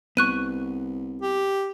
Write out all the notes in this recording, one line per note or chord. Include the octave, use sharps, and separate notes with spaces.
C2 B3 C#6 F#6 D#7
G4